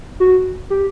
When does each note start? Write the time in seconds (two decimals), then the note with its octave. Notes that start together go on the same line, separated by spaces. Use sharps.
0.20 F#4
0.70 G4